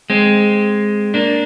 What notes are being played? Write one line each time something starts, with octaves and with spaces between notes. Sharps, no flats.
G#3 C4
A#3 D4